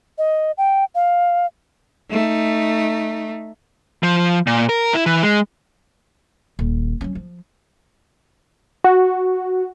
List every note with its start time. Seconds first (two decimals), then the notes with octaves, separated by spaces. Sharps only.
0.18 D#5
0.58 G5
0.95 F5
2.10 A3 D#4
4.03 F3
4.47 A#2
4.69 A#4
4.94 E4
5.06 E3
5.23 G#3
6.59 D#1
7.01 F#3 C#4
7.15 F3
8.84 F#4